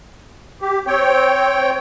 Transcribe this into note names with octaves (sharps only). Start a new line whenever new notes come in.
G4
C4 C#5 G5